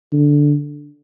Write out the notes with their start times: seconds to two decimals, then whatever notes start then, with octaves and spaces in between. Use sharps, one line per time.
0.12 D3